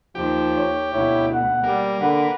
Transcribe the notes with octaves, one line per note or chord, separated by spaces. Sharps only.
D#2 D#3 F3 G4
C#5
D2 B2 E4 C#5
F#5
G3 A#3
D3 A#4 B4 F#5